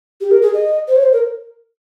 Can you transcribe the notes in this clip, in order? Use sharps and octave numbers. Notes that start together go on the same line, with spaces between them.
G4
A#4
G#4
D#5
C5
C#5
C5
A#4